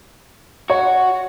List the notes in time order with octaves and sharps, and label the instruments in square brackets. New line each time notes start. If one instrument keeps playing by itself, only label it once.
[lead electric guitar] F#4 [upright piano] C#5